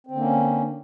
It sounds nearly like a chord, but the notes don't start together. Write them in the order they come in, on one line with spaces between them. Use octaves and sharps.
C4 D3 A#3 C#4